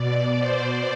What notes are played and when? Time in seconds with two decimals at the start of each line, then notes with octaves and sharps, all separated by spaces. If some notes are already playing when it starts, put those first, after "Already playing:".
Already playing: B2 D5
0.36 C5